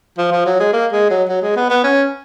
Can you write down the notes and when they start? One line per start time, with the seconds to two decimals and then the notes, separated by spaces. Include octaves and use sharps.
0.18 F3
0.32 F3
0.46 F#3
0.60 G#3
0.73 A#3
0.92 G#3
1.11 F#3
1.29 F#3
1.42 G#3
1.56 B3
1.70 B3
1.84 C#4